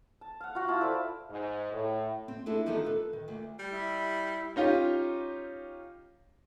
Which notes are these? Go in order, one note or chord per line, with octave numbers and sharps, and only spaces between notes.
A5
F5 F#5
F4 F#4
E4 F4 A5 B5
A4 C5 D5 B5
G#2
A2
C4
A3 D4 E4 G#4 A4
D#3 F3 G3 B3 D#4 A4
A4 B4
D#3
D2
G3
E4
C#4 D#4 F4 G4